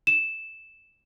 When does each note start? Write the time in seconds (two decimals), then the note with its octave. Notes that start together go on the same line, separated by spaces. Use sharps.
0.07 E7